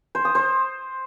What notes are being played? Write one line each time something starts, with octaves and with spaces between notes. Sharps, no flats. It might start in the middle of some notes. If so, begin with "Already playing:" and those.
C5
D#6
C5